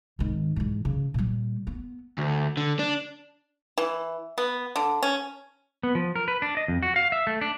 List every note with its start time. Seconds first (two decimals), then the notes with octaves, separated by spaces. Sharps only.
0.19 G#1 D#3
0.56 G#2 E3
0.85 C#3
1.14 A#2 G3
1.67 B3
2.18 D2
2.57 D3
2.79 D4
3.78 E3
4.38 B3
4.76 D3
5.03 C#4
5.83 B3
5.95 F3
6.16 A#4
6.28 B4
6.42 D4
6.57 D#5
6.68 F2
6.83 F#4
6.96 F5
7.12 E5
7.27 A3
7.41 D4